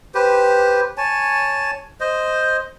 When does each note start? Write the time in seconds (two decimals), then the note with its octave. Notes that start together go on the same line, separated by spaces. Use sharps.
0.15 G4 B4 C5
0.98 C#5 G#5 A5
2.01 C5 D#5